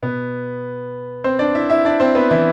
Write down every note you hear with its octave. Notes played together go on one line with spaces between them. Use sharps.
B2 B3 B4
C4 C5
D4 D5
E4 E5
E4 E5
D4 D5
C4 C5
B3 B4
E3 E4